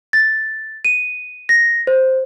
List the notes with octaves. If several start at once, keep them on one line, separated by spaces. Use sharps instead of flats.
A6
D#7
A#6
C5